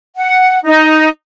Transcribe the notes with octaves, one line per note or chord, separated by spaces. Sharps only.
F#5
D#4